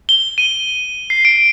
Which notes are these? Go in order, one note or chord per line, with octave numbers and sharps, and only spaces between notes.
G7
D#7
C7
D7